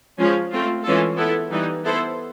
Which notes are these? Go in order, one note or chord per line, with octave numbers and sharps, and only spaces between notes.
F3 G#3 C#4
A3 C4 F4
E3 G#3 C#4 F4 A4
B3 E4 A4
E3 G3 B3 D#4
B3 E4 A4 C5